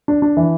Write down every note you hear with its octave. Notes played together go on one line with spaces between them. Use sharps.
D4
D4
E3